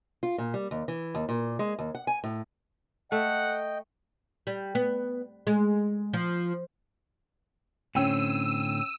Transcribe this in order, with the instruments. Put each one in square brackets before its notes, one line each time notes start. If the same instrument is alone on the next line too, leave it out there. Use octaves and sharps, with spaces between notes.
[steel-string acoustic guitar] F4
A#2
G3
D#2
E3
D#2
A#2
G#3
D#2
F#5
G#5
A2
[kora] A3 [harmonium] D#5 G5 [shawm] F#5
[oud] G3
B3
G#3
F3
[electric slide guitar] A2 D3 C4 [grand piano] C#4 G5 [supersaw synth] E6 D#7